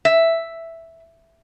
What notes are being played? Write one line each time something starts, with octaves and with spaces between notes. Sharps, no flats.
E5